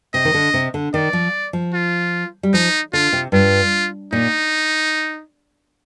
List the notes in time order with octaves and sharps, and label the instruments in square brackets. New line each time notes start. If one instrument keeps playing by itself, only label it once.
[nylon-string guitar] C3 [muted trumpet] D#5
[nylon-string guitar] D#3
D3
C3
D3
[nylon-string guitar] D#3 [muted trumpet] D5
[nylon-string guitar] F3
F3
[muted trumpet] F4
[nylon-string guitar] G3
[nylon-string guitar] F3 [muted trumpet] D#4
[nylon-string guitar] D3 [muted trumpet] F4
[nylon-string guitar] C3
[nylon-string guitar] G2 [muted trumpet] F4
[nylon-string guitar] A#2 [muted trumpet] D#4